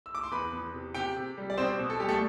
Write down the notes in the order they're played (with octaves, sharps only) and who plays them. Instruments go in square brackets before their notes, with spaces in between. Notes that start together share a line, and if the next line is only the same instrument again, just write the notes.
[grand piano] E6
D6
C6
E2 B4 B5
E2
C3
C3 G4 G5
C3
G3
D5
B2 C4 C5
B2
A4
G3 G4
A3 A4